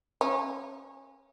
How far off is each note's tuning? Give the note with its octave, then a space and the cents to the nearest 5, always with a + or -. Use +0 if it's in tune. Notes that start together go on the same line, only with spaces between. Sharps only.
C#4 -25